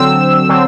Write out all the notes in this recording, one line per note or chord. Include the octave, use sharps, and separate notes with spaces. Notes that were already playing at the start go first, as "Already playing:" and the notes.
Already playing: D3 F#3 C4 E6
D3 F#3 C4